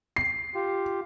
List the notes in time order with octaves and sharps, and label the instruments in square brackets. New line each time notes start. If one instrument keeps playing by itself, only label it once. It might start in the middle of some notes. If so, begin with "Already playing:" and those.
[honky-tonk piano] C7
[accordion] F4 G4